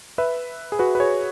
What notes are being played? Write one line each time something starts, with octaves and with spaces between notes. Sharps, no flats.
B4 E5
G#4
F#4 B4
B4
G#4 C#5